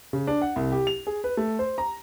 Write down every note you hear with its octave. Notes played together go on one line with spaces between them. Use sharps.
C#3
D4
F#5
C2
G4
F7
G#4
B4
A3
C5
A#5